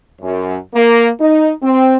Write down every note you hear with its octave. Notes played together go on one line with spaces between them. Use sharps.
F#2
A#3
D#4
C4